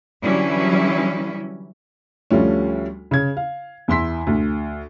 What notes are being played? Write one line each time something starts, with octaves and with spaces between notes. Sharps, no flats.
D3 E3 F#3 G3 C#4 E4
D2 F3 G3 A3 C#4
C#3 G#6
F5
E2 E4 C6 B6
D2